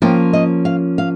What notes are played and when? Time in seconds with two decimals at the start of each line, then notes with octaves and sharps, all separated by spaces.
0.02 F3 A#3 C#4 G5
0.33 D#5
0.65 F5
0.98 F5